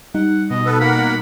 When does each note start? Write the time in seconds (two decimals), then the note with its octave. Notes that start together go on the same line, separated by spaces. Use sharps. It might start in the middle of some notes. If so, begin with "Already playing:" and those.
0.15 G3 D#4 F#5
0.50 B2 D#5
0.66 B3 A4 B4
0.80 A#3 A#4 F#5 B5